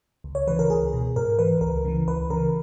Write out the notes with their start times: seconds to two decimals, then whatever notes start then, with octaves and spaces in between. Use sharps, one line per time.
0.24 C#2
0.35 C#5
0.47 C#3 E3 B4
0.59 A#4
0.69 C#2 G#4
0.93 B2
1.16 G#2 A#4
1.39 E3 B4
1.61 C#2 A#4
1.85 C#3 E3
2.07 C#2 B4
2.30 C#3 E3 A#4